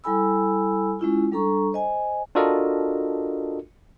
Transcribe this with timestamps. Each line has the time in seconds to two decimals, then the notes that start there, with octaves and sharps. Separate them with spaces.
0.04 G3 E4 A4 G#5 B5 E6
0.99 G#3 C#4 E4 F4
1.32 G3 D4 A4 A#5 C#6
1.73 C5 D#5 G#5
2.35 D4 F4 F#4 A4 A#4 D#5